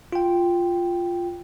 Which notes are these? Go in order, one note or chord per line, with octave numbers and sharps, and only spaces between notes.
F4 G5